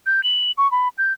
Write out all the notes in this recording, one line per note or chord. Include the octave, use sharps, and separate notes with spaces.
G6
F#7
C#6
B5
G6